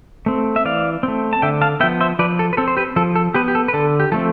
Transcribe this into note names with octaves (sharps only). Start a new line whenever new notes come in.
A3 C4
E5
E3 D5 F5
A3 C4
A5
D3 E5 G5
F5 A5
F3 B3 E5 G5
C5 E5
F3 B4 D5
A4
B4
C4 A4
C5
G4 B4
F3 A4
A4
B3 G4 B4
G4
A4
B4
D3 A4
G4
F3 A3 C4 A4